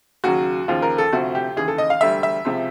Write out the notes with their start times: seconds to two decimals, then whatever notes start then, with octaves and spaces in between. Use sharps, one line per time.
0.24 D#2 C#3 F#3 F#4
0.68 D#2 C#3 F3 F4
0.82 A#4
0.98 A4
1.13 D2 C3 F3 F#4
1.35 G4
1.57 D#2 C#3 E3 G#4
1.68 A4
1.78 D#5
1.90 F5
2.01 E1 D2 D3 G3 E5
2.23 E5
2.45 C#2 C3 F3